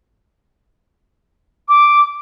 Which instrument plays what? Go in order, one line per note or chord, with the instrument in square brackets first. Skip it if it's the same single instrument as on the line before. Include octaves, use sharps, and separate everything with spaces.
[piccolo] D6